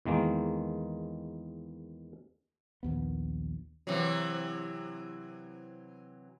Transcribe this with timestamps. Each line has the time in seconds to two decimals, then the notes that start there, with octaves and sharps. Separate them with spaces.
0.05 E2 D#3 G#3 A#3
2.83 A#1 D#2 B3
3.87 C3 E3 F#3